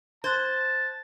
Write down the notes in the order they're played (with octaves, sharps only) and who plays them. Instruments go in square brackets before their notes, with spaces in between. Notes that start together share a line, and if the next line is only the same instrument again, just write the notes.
[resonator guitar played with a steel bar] C5 [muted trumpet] A5 [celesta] F#6 G#6